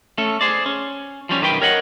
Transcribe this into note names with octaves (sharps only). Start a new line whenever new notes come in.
A3 C#4 A4
G#4 C5 D5
C#4
F3 G3 C#4
B1 F#2 D#3 G4 B4 G5
A#4 C#5 D#5 F#5